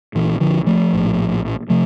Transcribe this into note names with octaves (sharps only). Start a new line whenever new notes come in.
A#1 A#2 E3
D3 F3
F3 A3
A#1 A2
C3 F3 A3